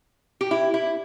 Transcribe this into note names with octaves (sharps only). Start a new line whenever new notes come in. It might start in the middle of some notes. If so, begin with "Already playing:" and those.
G4
E4
E4